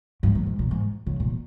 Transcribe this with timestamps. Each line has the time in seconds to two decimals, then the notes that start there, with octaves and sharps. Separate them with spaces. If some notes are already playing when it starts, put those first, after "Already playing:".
0.23 G2
0.35 G#2
0.46 G#2
0.59 A#2
0.71 G#2
1.07 C#3
1.20 A#2